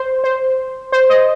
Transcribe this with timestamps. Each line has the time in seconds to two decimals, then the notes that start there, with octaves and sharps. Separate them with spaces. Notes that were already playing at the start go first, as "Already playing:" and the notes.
Already playing: C5
0.24 C5
0.92 C5
1.09 C5 D#5